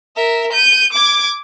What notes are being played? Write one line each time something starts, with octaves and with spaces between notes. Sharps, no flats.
A#4 E5
G6 D#7
D6 G#6